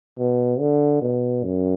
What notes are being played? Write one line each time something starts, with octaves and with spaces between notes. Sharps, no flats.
B2
D3
B2
F#2